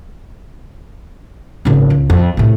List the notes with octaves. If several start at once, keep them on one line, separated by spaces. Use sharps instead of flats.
G#1 C#3
C#2
F2
A2 C3